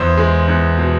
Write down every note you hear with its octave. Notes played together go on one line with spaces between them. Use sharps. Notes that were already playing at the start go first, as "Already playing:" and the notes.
Already playing: E2 C5
G#3
E2
B2